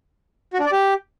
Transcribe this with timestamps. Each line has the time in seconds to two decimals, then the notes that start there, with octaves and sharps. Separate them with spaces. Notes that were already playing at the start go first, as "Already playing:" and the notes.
0.53 F#4
0.60 D4
0.66 D5
0.72 G4